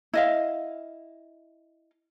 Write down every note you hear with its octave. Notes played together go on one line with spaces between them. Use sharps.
E4 D#5 F5